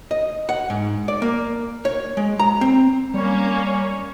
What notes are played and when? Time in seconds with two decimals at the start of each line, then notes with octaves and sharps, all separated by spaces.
0.11 D#5
0.49 F#5
0.70 G#2
1.08 D5
1.22 A#3
1.85 C#5
2.17 G#3
2.39 A#5
2.61 C4
3.14 G3 A#3 C#4 C#5